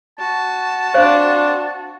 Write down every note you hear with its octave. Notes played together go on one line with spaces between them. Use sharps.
F#4 A5
C4 D4 C5 F5